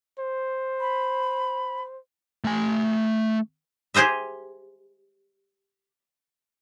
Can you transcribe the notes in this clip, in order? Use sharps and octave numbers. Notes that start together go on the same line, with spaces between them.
C5
B5
A3 G#5
G4 G#4 C5 D#5 E5